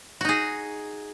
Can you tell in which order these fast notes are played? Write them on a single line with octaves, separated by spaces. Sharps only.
F#4 D#4 G#4